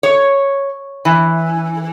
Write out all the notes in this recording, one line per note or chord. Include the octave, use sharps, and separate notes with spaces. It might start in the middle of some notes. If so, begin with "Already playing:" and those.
C#5
E3